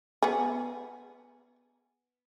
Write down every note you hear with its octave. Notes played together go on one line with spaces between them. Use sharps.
B3 G#4